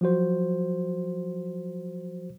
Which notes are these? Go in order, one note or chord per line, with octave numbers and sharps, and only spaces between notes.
F3 F#3 F#4 C5